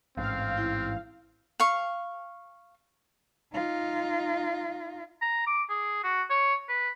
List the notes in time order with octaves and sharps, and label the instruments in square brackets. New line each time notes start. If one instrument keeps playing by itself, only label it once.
[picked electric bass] A1 G#2 [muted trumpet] C4 [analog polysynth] F5
[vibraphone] E4
[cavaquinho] F5 C#6
[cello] D#4 F4
[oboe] A#5
D6
G#4
F#4
C#5
B4